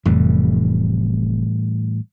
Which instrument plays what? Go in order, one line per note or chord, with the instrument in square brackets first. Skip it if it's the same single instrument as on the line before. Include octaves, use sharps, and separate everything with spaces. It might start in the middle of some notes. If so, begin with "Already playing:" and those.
[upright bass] F1 [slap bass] A2 E3 G3